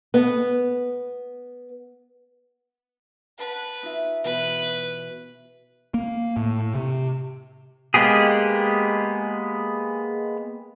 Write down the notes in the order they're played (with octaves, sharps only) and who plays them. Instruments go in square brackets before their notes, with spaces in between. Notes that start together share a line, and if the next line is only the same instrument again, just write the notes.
[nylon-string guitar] B3 D#5
[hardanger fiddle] B4 [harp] F#5 A5 B5
[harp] D#4 F4 E5
[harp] B2 E3 [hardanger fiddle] B4
[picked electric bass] A#3
A2
C3
[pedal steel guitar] G#3 A#3 B3 G4 G#4